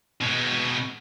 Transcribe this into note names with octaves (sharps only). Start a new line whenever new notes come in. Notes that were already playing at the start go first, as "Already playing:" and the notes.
B2 G#3